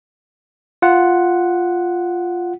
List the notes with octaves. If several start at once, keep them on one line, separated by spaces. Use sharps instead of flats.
F4 F#5